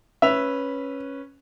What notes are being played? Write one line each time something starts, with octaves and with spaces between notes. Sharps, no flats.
C#4 B4 E5 F7